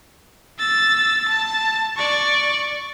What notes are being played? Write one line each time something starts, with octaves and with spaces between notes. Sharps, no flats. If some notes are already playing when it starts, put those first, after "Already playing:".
E6 A6
A5
D5 C#6